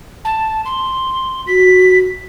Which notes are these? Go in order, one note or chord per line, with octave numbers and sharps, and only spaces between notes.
A5
C6
F#4 B6